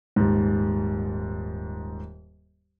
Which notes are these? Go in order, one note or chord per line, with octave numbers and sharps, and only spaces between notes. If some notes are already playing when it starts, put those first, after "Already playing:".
D#1 G#2